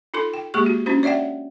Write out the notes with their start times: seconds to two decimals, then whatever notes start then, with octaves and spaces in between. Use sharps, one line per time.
0.14 D#4 F4 A4 C6
0.34 G5
0.54 G#3 A#3 G4 G#4 C#6
0.66 F#4
0.86 C#4 D4 E4 F#4 C5
1.03 C#5 D5 E5 F#5 G5